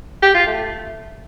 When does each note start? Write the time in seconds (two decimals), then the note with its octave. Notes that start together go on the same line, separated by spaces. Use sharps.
0.22 G4
0.34 F4
0.46 A3